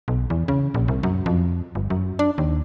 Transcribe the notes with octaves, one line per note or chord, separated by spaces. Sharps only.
B1
E2
C#3
A#1
C2
F#2
F2
G1
F#2
D4
D#2